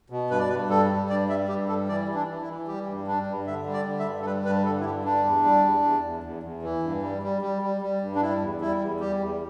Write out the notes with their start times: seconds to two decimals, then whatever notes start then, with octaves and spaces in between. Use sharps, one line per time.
0.10 B2
0.30 G2 B4
0.39 D5
0.49 G2 B4
0.69 G3 A4
0.90 G3
1.09 G2 D5
1.29 G3 E5
1.49 G2 G4
1.68 G3 A4
1.88 E3 D5
2.08 E3
2.15 D4
2.28 E3
2.41 E4
2.48 E3
2.67 G3 G4
2.87 G2
3.07 G3 D4
3.27 G2
3.47 D3 E5
3.66 G3
3.73 D5
3.85 D3
3.99 E5
4.06 G2
4.21 A4
4.25 G3 B4
4.45 G2 B4
4.65 D3 A4
4.80 E4
4.85 G2 G4
5.05 G3 D4
5.24 E2
5.45 G3
5.64 E2
5.84 E2
6.04 E2
6.23 E2
6.43 E2
6.63 E3
6.83 G2
7.02 G3
7.23 G3
7.42 G3
7.62 G3
7.81 G3
8.01 G2
8.15 D4
8.21 G3 E4
8.41 E2
8.61 G3 E4
8.81 E2
9.00 G3 G4
9.20 E2